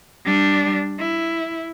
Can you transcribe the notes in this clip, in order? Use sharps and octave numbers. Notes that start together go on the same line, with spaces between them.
G3 D4
E4